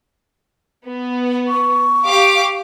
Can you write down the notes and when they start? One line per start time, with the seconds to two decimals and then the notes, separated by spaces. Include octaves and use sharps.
0.88 B3
1.48 C#6
2.06 G4 F5 D6